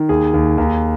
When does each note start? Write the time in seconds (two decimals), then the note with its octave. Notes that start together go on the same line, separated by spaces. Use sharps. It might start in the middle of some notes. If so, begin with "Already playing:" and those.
Already playing: D#3
0.09 D#2 G#4
0.34 D#2
0.58 D#2